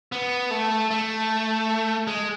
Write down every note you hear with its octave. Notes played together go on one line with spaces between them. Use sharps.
B3
A3
A3
G#3